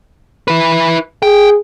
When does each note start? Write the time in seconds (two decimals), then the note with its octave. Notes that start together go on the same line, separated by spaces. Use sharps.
0.48 E4 B4
1.22 G#4 G5